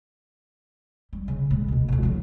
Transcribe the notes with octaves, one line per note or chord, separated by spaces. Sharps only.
G3
C#3
C#2 A#2
D2 B2
A1 D2
F3 F#3